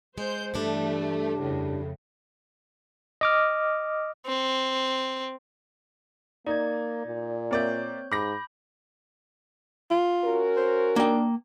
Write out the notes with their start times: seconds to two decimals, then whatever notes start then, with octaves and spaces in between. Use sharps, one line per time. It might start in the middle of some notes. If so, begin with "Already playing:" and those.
0.18 G#3 C5 G6
0.54 G2 E3 G3 A3 D4
1.39 F2 A2 C#3
3.21 D#5 D6 F6
4.26 C4
6.47 A#3 D#4 D5 G#6
7.06 A#2
7.51 A#3 C4 C#5 D5 E5 G6
8.12 G#2 B5 D6 G6 A#6
9.90 F4
10.24 C#4 F#4 A#4
10.56 C5
10.96 A#3 D4 G5